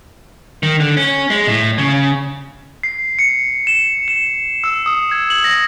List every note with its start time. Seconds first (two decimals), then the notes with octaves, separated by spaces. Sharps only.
0.63 D#3
0.80 D3
0.97 C#4
1.30 G#3
1.47 A2
1.78 C#3
2.83 C7
3.19 C#7
3.67 E7
4.08 E7
4.64 E6
4.86 D#6
5.11 G#6
5.30 F#7
5.44 A#6